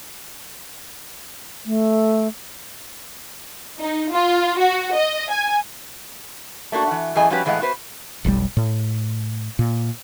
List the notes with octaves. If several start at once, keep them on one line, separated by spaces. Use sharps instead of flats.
A3
D#4
F4
F#4
D#5
G#5
A3 A#3 D4 F#4
E3 F#5
F#2 A2 E3 G#4 D#5 G#5
F3 G3 C#4 F#4 G4 B4
A2 E3 G#3 A3 F5 F#5
B3 F#4 B4 C5
F1 B1 A#2 G3
A2
A#2